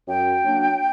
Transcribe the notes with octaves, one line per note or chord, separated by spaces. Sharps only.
F#2 G5
F#3 A#3 D4